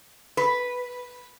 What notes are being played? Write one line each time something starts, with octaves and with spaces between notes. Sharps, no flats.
B4